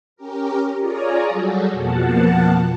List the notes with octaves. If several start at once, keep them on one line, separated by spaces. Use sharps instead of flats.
C#4 G4 A#4
F4 G#4 C#5 D5 G#5 A#5
F#3 G3 F#4 G#4 A4
F2 B2 F3 A#3 F#5 A5